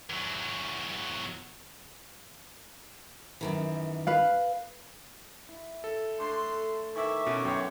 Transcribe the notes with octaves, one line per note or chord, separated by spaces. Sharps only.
E2 F#3
F#2 D#3 E3
B4 F5
E4
A4
A3 D4 C6
D#3 E3 E5 C#6 D6
B2 C#4 E4 C#5
F#2 B3 C#5 F#5 G5